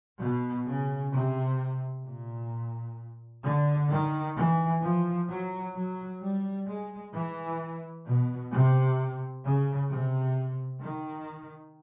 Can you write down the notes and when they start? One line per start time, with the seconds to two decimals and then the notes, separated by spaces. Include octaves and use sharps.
0.20 B2
0.67 C#3
1.13 C3
2.05 A#2
3.43 D3
3.90 D#3
4.37 E3
4.82 F3
5.28 F#3
5.74 F#3
6.21 G3
6.67 G#3
7.13 E3
8.05 B2
8.52 C3
9.44 C#3
9.90 C3
10.82 D#3